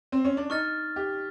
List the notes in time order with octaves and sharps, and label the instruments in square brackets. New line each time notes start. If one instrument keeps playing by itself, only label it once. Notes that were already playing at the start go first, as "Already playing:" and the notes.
[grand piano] C4
C#4
D4
[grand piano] D#4 [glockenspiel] C#6 F6 A6
[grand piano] G4